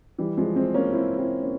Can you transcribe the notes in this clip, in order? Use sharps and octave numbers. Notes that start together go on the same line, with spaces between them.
E3 G3
F3 G#3
G#3 C4
A#3 C#4
C4 E4
C4 E4
A#3 C#4